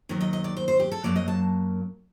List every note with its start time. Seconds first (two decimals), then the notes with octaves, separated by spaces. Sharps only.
0.09 D#2 D#3 F#3
0.21 D#5
0.33 D#5
0.44 D5
0.57 C5
0.68 C5
0.80 G4
0.91 A4
1.04 F#2 F#3 A#3 D5
1.16 D#5
1.28 A5